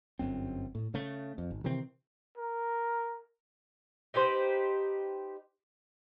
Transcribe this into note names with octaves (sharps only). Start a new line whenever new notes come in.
G1 F#2 C4
A2
C#3 A3
F2
G#1
C3 D#3 E3 C4
A#4
D#4 G4 B4 C5